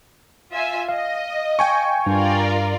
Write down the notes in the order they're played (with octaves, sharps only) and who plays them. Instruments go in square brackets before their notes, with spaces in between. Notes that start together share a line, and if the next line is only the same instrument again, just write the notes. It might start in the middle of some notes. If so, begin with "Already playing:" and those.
[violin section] F4 E5 G#5
[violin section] D#5 [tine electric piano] F5
[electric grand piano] G5 G#5 C#6
[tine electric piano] G2 [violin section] F4 A#4 D5